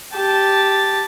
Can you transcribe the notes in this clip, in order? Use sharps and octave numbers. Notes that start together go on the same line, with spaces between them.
G4 A5